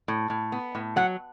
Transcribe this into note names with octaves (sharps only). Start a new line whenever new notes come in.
A2
A2
B3
A2
F#3 F#5